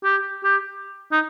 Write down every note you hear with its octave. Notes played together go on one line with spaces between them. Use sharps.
G4
G4
D#4